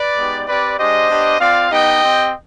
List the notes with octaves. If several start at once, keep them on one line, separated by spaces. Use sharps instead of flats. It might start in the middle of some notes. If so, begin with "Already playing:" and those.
Already playing: B4 D5
G#3 B3 D#4 G4
C4 G4 B4 D5
G#3 D4 G4 C5 D#5
B3 D4 G4
C4 F4 D5 F5
B3 D#4 G4 D#5 G5
C4 G4